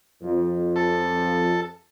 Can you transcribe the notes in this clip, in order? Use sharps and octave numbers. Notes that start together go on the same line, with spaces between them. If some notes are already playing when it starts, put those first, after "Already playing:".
F2
A4